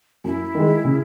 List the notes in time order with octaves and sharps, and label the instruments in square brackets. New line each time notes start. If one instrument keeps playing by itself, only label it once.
[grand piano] F#2 [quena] E4
[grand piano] D#3 G#3
C#3